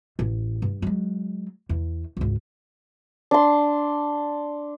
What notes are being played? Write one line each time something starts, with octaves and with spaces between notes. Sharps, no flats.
A1
G2
F#3 G#3
E2
G#1 C#2
D4 C6